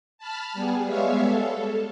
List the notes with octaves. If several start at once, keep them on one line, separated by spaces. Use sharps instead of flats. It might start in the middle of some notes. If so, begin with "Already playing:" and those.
A5 B5 F6
G3 B3 G#4
G3 G#3 B3 C#5 E5 F5
A4